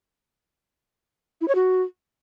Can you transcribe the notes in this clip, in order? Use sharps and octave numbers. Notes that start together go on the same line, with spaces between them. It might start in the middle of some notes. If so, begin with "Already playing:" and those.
E4
C#5
F#4